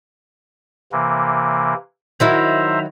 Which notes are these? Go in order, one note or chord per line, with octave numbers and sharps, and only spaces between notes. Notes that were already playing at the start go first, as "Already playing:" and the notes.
C3 E3 A#3
D#3 F#3 E4 C5 E5 A#5